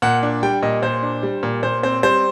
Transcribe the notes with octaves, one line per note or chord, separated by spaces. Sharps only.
A#2 F#5
D4
G3 G5
A#2 D#5
A#2 C5
D4
G3
A#2
A#2 C5
C4 C5
G3 C5